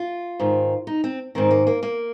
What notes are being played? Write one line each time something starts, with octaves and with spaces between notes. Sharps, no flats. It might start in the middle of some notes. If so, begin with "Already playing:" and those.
Already playing: F4
G#2 D#3
D#4
C4
G#2 D#3 C4
A#3
A#3
A#3